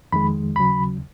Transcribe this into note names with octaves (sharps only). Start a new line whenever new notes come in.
F2 D#3 G#3 B5
D#2 C#3 F#3 B5